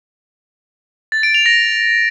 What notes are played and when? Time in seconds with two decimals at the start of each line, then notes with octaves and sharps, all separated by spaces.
1.12 A6
1.23 D7
1.34 F7
1.46 A#6